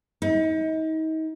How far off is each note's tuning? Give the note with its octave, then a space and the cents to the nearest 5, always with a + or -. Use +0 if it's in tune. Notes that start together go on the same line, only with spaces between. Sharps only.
D#4 +35